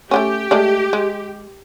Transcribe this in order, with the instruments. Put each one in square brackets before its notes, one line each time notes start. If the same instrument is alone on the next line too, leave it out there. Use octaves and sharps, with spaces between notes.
[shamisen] A3 B3 C#4 [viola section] G4
[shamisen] G#3 A3 D4
G#3